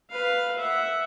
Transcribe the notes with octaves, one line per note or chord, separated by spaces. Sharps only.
B4 F5
E5 F#5